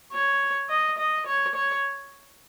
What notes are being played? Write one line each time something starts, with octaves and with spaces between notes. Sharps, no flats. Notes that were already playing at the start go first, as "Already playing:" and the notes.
C#5
D#5
D#5
C#5
C#5